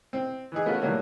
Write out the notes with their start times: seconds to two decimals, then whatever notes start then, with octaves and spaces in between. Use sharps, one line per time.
0.13 C4
0.52 E3 D#4 G#4
0.66 A3 B3 C#4 F4 F#4 A#4
0.82 A2 D#3 E3 F#3 G3 A#3